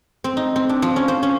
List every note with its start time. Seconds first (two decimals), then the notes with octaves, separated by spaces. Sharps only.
0.24 C4
0.37 D#4
0.56 C4
0.69 D4
0.82 F3
0.96 C#4
1.08 C5
1.23 C#4